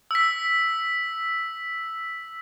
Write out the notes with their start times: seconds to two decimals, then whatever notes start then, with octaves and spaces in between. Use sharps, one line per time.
0.11 E6 B6